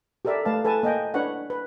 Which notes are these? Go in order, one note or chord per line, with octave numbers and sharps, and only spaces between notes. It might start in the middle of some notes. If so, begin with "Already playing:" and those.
G4 A4 A#4 D5 E5
A3 B4 F5 A5
A4 B4 G#5 A5
A#3 D#5 G5 G#5
D4 B4 C#5 F#5
B4